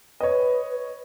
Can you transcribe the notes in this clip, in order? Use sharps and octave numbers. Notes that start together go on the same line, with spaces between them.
B4 C#5 D#5